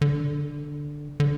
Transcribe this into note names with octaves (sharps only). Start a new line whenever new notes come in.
D3
D3